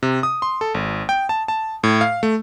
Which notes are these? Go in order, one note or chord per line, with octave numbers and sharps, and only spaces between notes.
C3
D#6
C6
A4
G#1
G5
A5
A5
A2
F5
A3